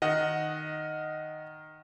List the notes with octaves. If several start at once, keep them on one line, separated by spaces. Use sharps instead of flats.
D#3 D#5 F#5